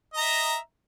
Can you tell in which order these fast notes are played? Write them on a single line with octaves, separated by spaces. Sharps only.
D#5 A#5 E5